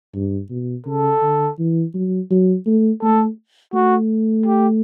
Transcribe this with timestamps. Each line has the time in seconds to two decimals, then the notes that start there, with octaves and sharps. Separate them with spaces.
0.15 G2
0.50 B2
0.86 C#3 A4
1.22 D3
1.59 E3
1.94 F#3
2.31 F#3
2.66 A3
3.02 A3 A4
3.74 A3 F#4
4.46 G4